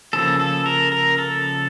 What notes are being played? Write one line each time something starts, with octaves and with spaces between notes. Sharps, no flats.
C#3 F3 A#3 A4
A4
A#4
A#4
A4